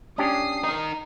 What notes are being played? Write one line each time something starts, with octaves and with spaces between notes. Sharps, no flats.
C#4 D4 G4 D#6 C7
D#4 A#4